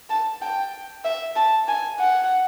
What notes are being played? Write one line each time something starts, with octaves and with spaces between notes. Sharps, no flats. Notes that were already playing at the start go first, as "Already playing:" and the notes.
A5
G5
E5
A5
G#5
F#5